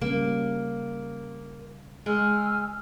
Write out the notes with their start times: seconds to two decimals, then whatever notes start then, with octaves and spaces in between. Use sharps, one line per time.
0.01 C#3 G3 A#3 C#4
2.06 G#3 G#5 E6 F6